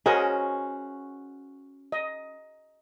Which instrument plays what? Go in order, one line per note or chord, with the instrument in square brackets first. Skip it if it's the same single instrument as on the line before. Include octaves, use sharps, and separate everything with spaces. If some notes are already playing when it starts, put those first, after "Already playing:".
[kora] C#4 F#4 C5 [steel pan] G#4 A#4 D#5
[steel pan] D#5